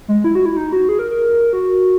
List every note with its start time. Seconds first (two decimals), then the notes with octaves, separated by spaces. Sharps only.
0.08 G#3
0.24 E4
0.35 F#4
0.46 E4
0.57 D#4
0.73 F#4
0.89 G#4
0.99 A#4
1.11 A#4
1.53 F#4